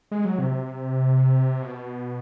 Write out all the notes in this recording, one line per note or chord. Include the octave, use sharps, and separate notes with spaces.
G#3
F#3
C3
B2